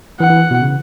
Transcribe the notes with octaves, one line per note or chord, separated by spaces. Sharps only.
E3 F#5
E3
B2
C#3